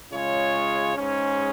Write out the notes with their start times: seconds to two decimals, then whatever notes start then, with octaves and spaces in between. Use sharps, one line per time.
0.12 C#3 G#3 F4 C#5
0.97 G#2 G#3 C#4